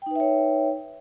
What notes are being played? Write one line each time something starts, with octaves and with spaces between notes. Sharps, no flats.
D#4 B4 C#5 E5 G5